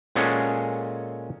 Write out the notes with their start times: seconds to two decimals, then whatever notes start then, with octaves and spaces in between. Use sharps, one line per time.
0.16 A#2 G#3 C#4 G#4 A4 F#5